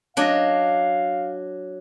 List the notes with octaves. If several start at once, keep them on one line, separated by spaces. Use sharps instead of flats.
F#3 D4 D#5 F5